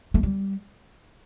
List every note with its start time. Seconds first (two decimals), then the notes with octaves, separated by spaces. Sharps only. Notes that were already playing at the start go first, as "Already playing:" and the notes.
0.14 A3
0.23 G3